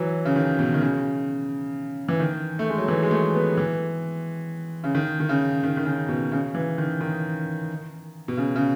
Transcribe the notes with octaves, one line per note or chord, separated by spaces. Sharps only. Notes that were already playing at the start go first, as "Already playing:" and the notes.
Already playing: E3 F#3
C#3
D#3
B2
D#3
C#3
E3
D#3
A3
G#3
F#3
E3
G#3
A3
B3
E3
C#3
D#3
D#3
C#3
D#3
D#3
C#3
B2
C#3
E3
D#3
D#3
B2
C#3
C#3